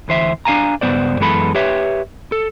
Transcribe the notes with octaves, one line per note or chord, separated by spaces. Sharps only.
D2 E3 C5 E5
D4 F5 G#5 A#5
C#2 G2 D#3 B3 C5 D5
F#2 E3 G#3 B3 A4 B5
G4 B4 C#5 E5
A4